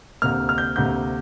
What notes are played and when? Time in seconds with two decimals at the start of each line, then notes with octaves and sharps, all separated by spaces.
0.22 D2 C3 A#3 F6
0.49 F6
0.58 G6
0.76 D2 C3 A#3 G6